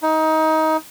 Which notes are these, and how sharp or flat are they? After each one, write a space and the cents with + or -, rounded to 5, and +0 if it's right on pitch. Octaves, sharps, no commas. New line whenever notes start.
D#4 +20